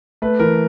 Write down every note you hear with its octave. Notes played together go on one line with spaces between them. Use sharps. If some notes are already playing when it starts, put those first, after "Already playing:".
A3 B4
E3 A#4